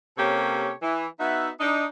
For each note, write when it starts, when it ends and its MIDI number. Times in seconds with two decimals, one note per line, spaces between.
0.17 0.72 48
0.17 0.72 58
0.17 0.72 61
0.17 0.72 67
0.17 0.72 69
0.17 0.72 73
0.82 1.06 52
1.19 1.49 59
1.19 1.49 63
1.19 1.49 66
1.19 1.49 76
1.60 1.86 62
1.60 1.86 63